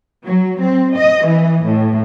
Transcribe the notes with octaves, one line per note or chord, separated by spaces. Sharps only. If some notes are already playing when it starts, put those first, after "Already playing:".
F#3
C4
D#5
E3
A2